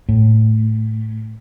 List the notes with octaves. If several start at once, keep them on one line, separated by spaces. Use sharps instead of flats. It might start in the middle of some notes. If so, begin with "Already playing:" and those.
A2